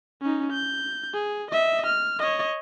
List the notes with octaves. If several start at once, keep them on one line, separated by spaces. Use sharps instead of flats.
C#4 D#4
G6
G#4
D#5 E5
F6
C#5 D#5